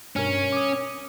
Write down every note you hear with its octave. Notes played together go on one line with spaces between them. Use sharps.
G2 B2 C#4 A#4
D6 D#6